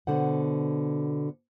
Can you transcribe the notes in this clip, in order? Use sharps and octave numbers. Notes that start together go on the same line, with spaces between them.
B2 D3 C5 F#5